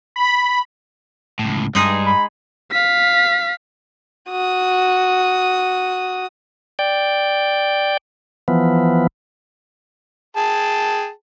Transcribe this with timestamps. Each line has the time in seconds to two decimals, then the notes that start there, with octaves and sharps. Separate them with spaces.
0.16 B5
1.39 C#2 A2
1.75 G2 G#3 D#4 G#4
2.06 B5
2.71 F5 B6
4.30 F#4 D#6
6.79 D5 G5
8.48 E3 F3 B3
10.37 G#4 G5 A5